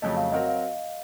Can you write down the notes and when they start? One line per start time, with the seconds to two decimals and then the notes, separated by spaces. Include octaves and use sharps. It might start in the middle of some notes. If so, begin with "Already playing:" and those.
0.02 F2 C#3 F#3 A3 D#5
0.17 F5
0.32 F#3 C4 F#4 A#4 D#5
0.48 F5